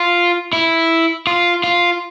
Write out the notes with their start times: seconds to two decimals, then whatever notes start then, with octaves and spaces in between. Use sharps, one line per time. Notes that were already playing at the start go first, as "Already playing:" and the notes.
Already playing: F4
0.53 E4
1.27 F4
1.64 F4